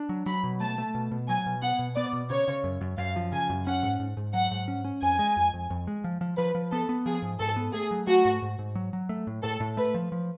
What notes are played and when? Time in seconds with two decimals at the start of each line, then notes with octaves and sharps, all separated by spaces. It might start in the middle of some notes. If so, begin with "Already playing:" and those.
Already playing: D4
0.09 F#3
0.26 F#3 B5
0.44 B2
0.60 A3 A5
0.78 A3
0.95 B2
1.11 B2
1.29 F#3 G#5
1.46 B2
1.62 B3 F#5
1.79 B2
1.96 B3 D5
2.13 B2
2.30 C#3 C#5
2.48 C#3
2.64 F#2
2.81 F#2
2.98 F#2 F5
3.16 F3
3.32 C#3 G#5
3.50 F#2
3.66 C#4 F#5
3.83 G#2
4.00 G#2
4.17 G#2
4.34 F#3 F#5
4.51 G#2
4.68 C#4
4.85 C#4
5.02 F2 G#5
5.19 G#3
5.37 F2
5.54 F2
5.70 F2
5.87 G#3
6.04 F3
6.21 F3
6.37 F3 B4
6.55 F3
6.72 B3 A4
6.89 B3
7.06 F3 G#4
7.22 G#2
7.40 G#2 A4
7.57 B3
7.73 A3 G#4
7.91 F#3
8.07 A3 F#4
8.25 G#2
8.42 G#2
8.59 G#2
8.75 F#3
8.93 F#3
9.09 A3
9.27 A2
9.43 A2 A4
9.60 A2
9.77 A3 B4
9.95 F3
10.12 F3